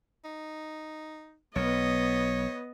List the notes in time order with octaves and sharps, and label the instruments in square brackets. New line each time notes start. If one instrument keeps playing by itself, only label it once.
[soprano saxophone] D#4
[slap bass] B1 [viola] B3 D#5 [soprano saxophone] C#5